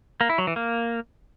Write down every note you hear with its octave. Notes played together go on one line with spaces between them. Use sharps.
A#3
E4
F#3
E3
A#3